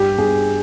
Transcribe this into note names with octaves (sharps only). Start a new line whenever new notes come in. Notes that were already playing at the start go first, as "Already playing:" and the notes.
Already playing: G2 G4
G2 G#4